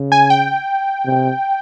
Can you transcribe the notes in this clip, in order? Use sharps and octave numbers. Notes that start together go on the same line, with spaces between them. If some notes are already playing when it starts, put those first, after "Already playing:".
Already playing: C#3
G#5
G5
C3